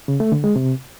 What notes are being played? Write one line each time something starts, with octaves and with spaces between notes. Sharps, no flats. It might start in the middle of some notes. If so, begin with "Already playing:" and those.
C#3
A3
D3
G#3
C3